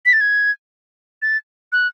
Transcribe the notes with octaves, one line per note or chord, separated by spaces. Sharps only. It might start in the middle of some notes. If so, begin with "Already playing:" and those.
B6
A6
G#6
A6
F#6